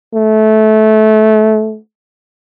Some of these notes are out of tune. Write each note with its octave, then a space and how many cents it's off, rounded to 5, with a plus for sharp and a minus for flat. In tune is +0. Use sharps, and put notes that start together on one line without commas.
A3 -20